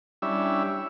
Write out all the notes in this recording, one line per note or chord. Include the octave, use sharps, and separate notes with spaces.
G3 C#4 D4 E4 E5